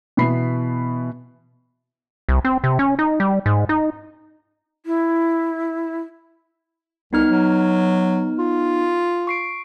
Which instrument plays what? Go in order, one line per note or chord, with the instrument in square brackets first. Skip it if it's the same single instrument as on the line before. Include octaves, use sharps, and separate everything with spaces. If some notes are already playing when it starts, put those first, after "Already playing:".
[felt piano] B2 E3 B3 B5 C7
[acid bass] C2
C4
C3
C#4
D#4
G3
G#2
D#4
[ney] E4
[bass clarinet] C2 [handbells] B3 D#4 F6
[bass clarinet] F#3
F4
[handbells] C#6 C7 D7